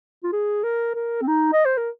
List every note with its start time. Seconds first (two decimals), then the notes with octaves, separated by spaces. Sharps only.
0.23 F4
0.32 G#4
0.64 A#4
0.95 A#4
1.22 C4
1.27 D#4
1.53 D#5
1.66 C5
1.78 A#4